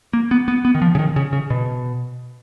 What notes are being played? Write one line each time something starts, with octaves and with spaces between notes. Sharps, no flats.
A#3
B3
B3
B3
D#3
F3
C#3
D#3
C#3
C#3
B2